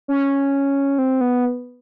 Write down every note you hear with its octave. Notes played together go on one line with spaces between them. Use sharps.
C#4
C4
B3